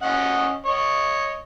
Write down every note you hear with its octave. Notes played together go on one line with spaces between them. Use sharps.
C#4 D#5 F#5
C#5 D#5